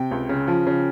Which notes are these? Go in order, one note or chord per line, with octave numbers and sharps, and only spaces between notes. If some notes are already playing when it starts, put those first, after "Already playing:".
Already playing: C3 G5
C#2
C#3
F3
C#3